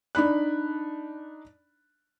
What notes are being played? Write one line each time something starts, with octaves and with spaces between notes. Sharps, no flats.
D4 D#4 B5 F#6